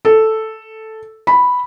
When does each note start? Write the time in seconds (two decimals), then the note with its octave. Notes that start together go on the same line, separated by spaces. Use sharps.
0.05 A4
1.27 B5